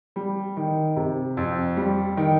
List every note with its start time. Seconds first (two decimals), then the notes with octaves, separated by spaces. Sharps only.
0.16 G3
0.57 D#3
0.96 C3
1.37 F2
1.77 G3
2.17 D#3